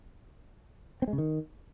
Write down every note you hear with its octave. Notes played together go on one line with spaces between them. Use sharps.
C4
G#3
C#3
D#3